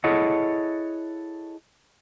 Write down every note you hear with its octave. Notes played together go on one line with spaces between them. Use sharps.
E4 G#4 A4 C#5 D#5 F#5